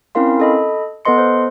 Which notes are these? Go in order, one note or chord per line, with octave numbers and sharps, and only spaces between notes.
C4 C#4 E4 A#4 F5 C6
A4 D#5 B5
B3 A4 B4 D#5 C6 C#7
C5